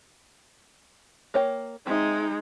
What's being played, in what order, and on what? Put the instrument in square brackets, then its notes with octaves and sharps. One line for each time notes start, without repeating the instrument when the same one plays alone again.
[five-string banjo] A#3 C#5 G5
[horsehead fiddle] G#3 [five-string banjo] C4 E5 [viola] D#4